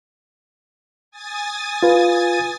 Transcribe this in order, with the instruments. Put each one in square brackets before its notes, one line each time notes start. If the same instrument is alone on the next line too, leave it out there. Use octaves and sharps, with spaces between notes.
[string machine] G#5 D#6 A6
[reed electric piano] F4 B4